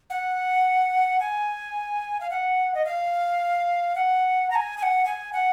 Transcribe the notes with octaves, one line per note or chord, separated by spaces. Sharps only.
F#5
G#5
F5
F#5
D#5
F5
F#5
A#5
G#5
G#5
F#5
G#5
F#5